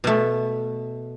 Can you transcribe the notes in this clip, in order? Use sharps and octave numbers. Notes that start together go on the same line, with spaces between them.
B2 A3